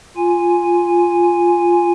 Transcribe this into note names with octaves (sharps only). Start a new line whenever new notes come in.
F4 G#5